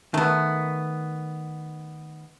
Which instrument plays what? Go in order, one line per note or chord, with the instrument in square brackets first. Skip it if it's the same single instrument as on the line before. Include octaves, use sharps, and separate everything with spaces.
[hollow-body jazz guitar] D#3 [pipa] A3 B3